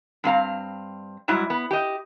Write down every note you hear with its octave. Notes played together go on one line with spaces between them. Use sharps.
G2 C4 F5 A#5
G#2 F#3 G3 E4
B3
G4 D#5